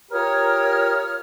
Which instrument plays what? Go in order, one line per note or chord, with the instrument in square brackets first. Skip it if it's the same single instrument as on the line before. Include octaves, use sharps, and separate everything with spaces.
[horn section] F4 G4 A#4 [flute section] C#5 D#6 F6